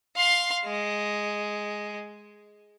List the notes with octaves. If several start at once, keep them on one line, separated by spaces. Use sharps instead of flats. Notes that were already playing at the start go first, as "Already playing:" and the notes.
F5 C6
G#3